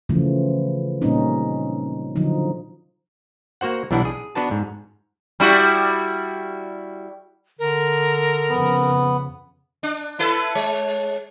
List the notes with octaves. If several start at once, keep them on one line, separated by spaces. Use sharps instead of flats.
C#3 E3 F3 A3
A#2 G3 A#3 C4 C#4 D#4
D3 F3 F#3 D#4
A#3 F#4 C5 F#5
B1 E3 G3 D4 E4 F#5
G#4
B3 D4 F#4 B4 A5
G#2
G3 E4 F#4
D3 A#4
F2 C#3 B3
D4
E4 A4 B4
G#3 C#5